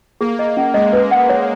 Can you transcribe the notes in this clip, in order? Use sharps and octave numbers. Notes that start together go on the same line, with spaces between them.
A#3 G#4
D#5
C#4
G#3 D#5
B4
F#5
C#5